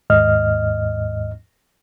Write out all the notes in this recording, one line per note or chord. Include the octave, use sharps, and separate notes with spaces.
D#2 G#2 D#5 F6